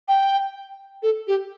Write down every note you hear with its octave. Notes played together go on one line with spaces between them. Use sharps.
G5
A4
G4